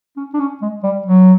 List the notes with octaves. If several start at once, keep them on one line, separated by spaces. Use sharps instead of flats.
C#4
D4
C#4
G#3
G3
F#3